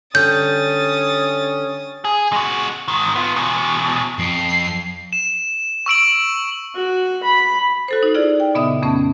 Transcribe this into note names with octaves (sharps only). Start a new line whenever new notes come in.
D3 G3 C#4 D#6 G6 A6
G#4
G#3 F#4
G#2 D#3
B3 F4
E2 B2
F2 C7
E7
C#6 E6 D7 F#7
F#4
B5
F#4 A4 C5
D#4
E4 F4 G#4 D5
G5
A#2 C#3 B3 D#5 E5 D#6
F2 A3 B3 C#4